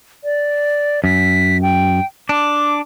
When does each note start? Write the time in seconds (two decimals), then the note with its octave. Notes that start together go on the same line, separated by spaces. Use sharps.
0.24 D5
1.04 F#2 B6
1.62 G5
2.29 D4 D6